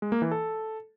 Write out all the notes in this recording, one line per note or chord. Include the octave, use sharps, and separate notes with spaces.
G#3
A#3
E3
A4